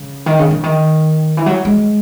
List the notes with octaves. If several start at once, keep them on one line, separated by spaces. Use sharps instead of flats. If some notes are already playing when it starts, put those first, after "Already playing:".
Already playing: C#3
D#3
C#3
D3
D#3
E3
F#3
G#3